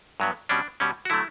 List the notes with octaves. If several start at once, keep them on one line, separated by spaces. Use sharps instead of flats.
G2 F#3 B3
B2 G3 C#4 D4
B2 G3 C#4
F#4
D3 F#3 A3 E4